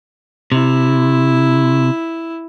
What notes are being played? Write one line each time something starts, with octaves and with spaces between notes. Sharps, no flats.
C3 E4